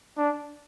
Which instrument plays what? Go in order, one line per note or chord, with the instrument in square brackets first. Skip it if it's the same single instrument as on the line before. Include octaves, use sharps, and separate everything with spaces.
[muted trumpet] D4